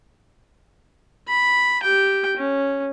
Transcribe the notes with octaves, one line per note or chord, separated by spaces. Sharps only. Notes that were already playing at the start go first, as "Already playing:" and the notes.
B5
G4 G5
C#4